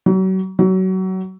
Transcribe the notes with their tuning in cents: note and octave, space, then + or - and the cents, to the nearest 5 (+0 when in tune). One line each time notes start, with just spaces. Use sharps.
F#3 +35
F#3 +25